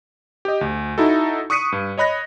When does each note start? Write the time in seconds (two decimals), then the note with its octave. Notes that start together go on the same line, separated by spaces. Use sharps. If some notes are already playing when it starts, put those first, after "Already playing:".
0.45 G4 D#5
0.61 D2
0.98 D#4 E4 F#4 A4
1.50 C#6 D#6 F#6 B6 C#7 D#7
1.72 G2
1.98 C#5 D#5 B5 F#6 A#6